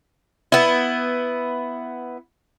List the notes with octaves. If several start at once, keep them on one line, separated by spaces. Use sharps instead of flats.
B3 E4